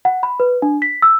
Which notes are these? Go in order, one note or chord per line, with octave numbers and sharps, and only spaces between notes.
F#5
B5
B4
D4
B6
E6